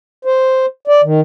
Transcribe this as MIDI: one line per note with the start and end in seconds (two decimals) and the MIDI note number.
0.25 0.66 72
0.88 1.01 74
1.04 1.21 51